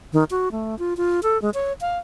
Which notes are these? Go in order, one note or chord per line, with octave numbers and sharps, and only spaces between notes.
D#3
F#4
A3
F4
F4
A4
G#3
C#5
F5